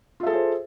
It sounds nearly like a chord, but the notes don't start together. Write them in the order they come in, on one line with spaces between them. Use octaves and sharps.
F4 E5 A4 G#4 C5